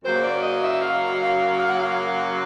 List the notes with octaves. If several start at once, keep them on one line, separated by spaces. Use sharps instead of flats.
F#2 C#3 F#3 A#3 C5
D5
D#5
E5
F5
F5
F5
F#5
F5